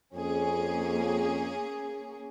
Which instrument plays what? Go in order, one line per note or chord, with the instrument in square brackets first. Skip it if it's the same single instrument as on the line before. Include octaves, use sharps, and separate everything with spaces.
[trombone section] F2 [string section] A#3 C#4 G#4